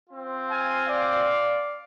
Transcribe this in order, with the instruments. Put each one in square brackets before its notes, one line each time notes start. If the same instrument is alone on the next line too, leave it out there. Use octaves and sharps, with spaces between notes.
[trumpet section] C4 F4
F5 G#5
D5 F5